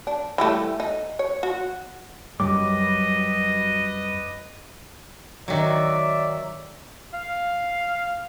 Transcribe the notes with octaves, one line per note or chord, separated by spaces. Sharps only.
D4
E3 G3 A3
D#4
C#5
F#4
F#2 F#3 G3 B4 D#5 D6
D#3 F#3 D5 E5
F5